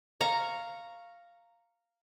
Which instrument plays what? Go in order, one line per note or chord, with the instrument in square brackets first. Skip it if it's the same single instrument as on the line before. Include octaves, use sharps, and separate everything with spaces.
[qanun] F5 A#5 C#6